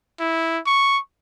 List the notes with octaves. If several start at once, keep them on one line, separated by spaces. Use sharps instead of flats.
E4
C#6